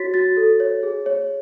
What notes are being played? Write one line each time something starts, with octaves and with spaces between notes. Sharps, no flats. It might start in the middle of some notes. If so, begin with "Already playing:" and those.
Already playing: F#4 C#5 A6 B6
F#4 A6
A4
C#5
G#4
C#5